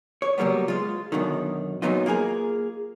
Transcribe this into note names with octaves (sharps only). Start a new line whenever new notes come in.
C#5
C#3 F#3 G3 A#3 B3
G#3 F4
F#2 B2 D3 D#3
F#2 A#2 F#3 B3 D#4 F4
A#3 F4 G#4 A#5